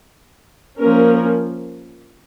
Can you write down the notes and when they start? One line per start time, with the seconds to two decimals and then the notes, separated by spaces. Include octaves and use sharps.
0.79 F3 A#3 C#4 A#4